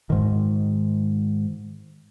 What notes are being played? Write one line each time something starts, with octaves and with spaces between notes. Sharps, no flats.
G#2 D#3